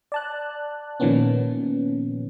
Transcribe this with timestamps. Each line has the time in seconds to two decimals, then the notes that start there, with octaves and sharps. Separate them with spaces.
0.12 D5 A5 F#6
1.00 A#2 D#3 F3 A#3 B3 C#4